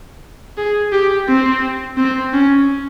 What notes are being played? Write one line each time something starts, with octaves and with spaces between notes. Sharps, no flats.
G#4
G4
C4
C4
C#4